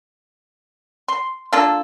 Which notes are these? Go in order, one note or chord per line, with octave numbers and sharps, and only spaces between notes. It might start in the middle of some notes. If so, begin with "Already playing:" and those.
C6
A#3 D4 F4 A4